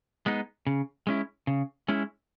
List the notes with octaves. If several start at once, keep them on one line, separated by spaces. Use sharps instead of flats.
G#3 B3 D#4
C#3
G#3 C#4 E4
C#3
G#3 C#4 E4